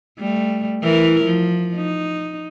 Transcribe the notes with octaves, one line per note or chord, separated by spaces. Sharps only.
G3 A3
E3 E4 A#4
F3
D#4